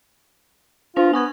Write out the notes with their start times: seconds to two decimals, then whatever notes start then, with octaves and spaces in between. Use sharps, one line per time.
0.96 D4 F4 C5 F7
1.13 B3 G#5 C#6 G#6